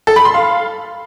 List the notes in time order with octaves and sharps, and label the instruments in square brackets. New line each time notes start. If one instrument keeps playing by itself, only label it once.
[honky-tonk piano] A4
B5
C6
F5